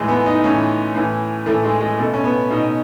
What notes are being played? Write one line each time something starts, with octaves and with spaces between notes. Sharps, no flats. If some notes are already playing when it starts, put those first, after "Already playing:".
Already playing: A2 E3 G#3
B3
D#4
A2 E3 C#4
A2 E3
A2 E3 A3
G#3
G#3
B2 A3
C#4
B3
B2 D#4